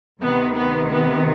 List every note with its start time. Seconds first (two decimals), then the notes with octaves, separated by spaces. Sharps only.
0.21 D2 C3 D#3 B3
0.55 B3
0.91 B3